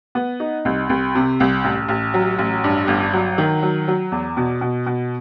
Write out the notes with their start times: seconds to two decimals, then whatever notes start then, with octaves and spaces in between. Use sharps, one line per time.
0.15 B3
0.40 D#4
0.65 C2
0.89 C2
1.15 C3
1.40 C2
1.64 A1
1.88 A1
2.14 F#3
2.39 A1
2.64 G2
2.88 G1
3.13 F#3
3.38 D#3
3.62 F#3
3.88 F#3
4.12 E2
4.37 B2
4.61 B2
4.86 B2